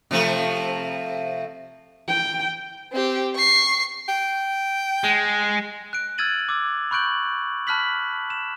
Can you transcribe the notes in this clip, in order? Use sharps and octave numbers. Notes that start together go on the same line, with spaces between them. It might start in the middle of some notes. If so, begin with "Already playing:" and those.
C3 F3 A3
G5
C4 G4
C#6 C7
G5
G#3
F#6 D7
E6 F6 G#6 A6 D#7 F#7
D6 E6
B5 C#6 F#6 G6 D7 F#7
A5 B5 F6 F#6 B6 F#7
E7